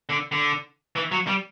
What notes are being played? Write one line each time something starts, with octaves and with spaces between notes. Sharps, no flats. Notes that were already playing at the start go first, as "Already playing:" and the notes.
D3
D3
E3
F#3
G3